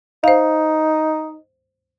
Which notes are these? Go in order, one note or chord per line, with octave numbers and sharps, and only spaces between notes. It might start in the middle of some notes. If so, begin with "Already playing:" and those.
D#4 C5 F5